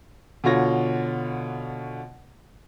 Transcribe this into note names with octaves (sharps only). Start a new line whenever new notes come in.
B2 D3 F4 C#5 A#6